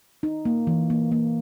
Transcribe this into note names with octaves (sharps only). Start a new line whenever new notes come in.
D#4
A#3
E3
A#3
A#3